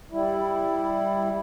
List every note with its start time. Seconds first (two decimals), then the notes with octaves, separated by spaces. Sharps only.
0.12 G3 E4